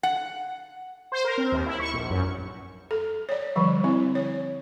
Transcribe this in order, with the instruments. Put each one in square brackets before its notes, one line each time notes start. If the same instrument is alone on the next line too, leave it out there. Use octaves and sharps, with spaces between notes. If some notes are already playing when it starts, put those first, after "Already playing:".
[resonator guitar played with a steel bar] F#5
[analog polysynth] C5
A#4
C4
D#2
E4
C#6
A#1
F#2
[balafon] A4
C#5 D5
D3 F3 G3
C4 E4
C#5